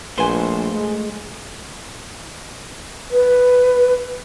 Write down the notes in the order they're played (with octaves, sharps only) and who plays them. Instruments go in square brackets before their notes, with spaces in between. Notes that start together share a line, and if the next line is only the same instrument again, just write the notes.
[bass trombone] A#1 [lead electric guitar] A3 C5 [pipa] B4 G#5
[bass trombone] G#3
[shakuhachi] B4